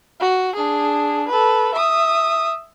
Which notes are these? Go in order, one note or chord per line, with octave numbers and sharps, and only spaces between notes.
F#4
D4 G#4
A4 B4
E5 D#6